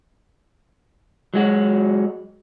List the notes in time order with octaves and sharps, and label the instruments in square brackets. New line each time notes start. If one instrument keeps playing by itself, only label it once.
[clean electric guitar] F#3 G#3 F#4